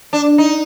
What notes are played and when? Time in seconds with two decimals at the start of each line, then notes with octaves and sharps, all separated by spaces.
0.13 D4
0.38 D#4